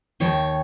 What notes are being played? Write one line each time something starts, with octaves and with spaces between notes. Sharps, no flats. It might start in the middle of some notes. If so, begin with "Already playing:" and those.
D#2 D#3 C#5